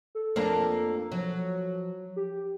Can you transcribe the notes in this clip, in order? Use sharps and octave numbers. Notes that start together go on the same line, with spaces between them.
A4
F2 A#3 D4
F3 F#3
G4